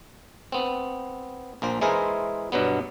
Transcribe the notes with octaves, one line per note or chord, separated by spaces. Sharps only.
B3 C4
A#1 A#3 C5
E3 G#3 E4 G#4 A#4 C5
G2 B2 F#3 B3